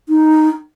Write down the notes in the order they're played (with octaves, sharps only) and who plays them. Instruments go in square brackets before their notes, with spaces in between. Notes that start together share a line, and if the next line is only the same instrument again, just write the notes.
[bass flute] D#4